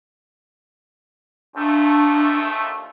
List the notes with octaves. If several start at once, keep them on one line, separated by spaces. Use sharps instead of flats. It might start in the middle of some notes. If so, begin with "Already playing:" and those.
D#2 A#2 A3 D4